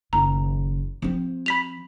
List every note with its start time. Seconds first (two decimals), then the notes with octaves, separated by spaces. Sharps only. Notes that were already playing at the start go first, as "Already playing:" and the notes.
0.13 F#1 D#3 A#5
1.02 F3 C4
1.46 B5 B6 F7